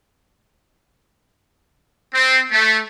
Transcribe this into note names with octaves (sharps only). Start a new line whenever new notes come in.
C4
A3